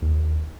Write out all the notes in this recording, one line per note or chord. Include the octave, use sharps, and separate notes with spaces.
D#2